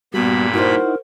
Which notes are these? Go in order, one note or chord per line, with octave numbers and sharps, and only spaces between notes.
G2 A#2 G3 B3 F#4 B5
D#4 E4 F#4 A#4 C5